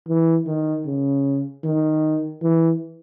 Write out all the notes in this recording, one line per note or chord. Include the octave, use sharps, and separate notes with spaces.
E3
D#3
C#3
D#3
E3